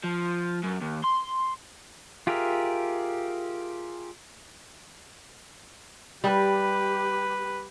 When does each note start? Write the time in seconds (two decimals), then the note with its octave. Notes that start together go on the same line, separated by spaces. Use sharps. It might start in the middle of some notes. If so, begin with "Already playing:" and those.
0.04 F3
0.64 F#2
0.81 D#2
1.04 C6
2.27 F4 G4 G#4 A#4 E5
6.24 G3 G4 B4